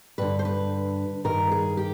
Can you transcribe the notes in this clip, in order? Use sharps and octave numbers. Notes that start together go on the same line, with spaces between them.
G2 D3 B4
C5
B4
G2 D#3 A#4
G#4
G4